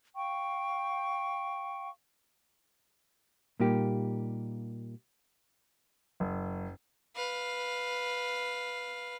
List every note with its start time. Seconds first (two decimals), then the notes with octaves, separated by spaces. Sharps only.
0.15 F5 G5 C#6
3.60 A#2 G3 A#3 D#4 G4
6.20 F#1
7.16 B4 F5